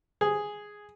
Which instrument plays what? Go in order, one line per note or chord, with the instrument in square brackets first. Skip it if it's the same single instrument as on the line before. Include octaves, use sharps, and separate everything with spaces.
[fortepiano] G#4